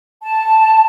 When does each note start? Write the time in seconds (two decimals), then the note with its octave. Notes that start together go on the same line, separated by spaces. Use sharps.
0.22 A5